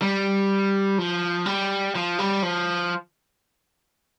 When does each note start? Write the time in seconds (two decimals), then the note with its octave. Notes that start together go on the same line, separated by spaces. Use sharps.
0.02 G3
0.98 F3
1.46 G3
1.95 F3
2.19 G3
2.43 F3